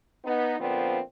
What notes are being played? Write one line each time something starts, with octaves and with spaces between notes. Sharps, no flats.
B3 D#4
A#2 D3 F3 B3 C4